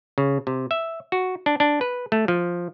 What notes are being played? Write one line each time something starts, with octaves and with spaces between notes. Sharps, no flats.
C#3
C3
E5
F#4
D4
D4
B4
A3
F3